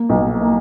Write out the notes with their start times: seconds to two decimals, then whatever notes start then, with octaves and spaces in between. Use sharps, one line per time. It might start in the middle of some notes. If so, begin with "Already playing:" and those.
Already playing: A#3
0.10 B1
0.41 A#3